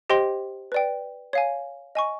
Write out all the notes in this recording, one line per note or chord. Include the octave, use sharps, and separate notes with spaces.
G4 C5 D#5 G5 C6
B4 D5 G5
C#5 F5 G#5
D#5 G#5 C#6